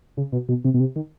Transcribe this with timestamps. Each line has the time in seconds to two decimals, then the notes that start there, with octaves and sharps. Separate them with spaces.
0.17 C#3
0.32 B2
0.49 B2
0.65 C3
0.74 B2
0.80 C3
0.96 D#3